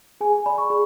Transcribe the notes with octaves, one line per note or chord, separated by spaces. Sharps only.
G#4 G#5
D5 B5
C#6
G#4 B5